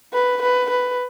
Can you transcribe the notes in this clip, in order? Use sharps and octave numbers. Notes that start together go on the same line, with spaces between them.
B4
B4
B4